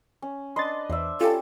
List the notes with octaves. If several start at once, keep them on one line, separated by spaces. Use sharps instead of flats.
C#4
D4 B4 D#5 C6 A6
E2 C5 D5 E5
C#4 F4 G4 A4